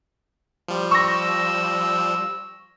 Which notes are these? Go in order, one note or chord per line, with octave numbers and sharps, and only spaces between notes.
F3 G3
C#6 E6 A#6